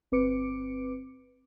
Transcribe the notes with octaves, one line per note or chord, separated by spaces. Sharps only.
G1 C4 B4 D6 C#7 D7